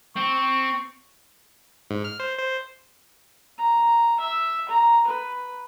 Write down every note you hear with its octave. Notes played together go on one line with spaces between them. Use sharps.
C4 C#6
G#2
F6
C5
C5
A#5
E5
A#5
B4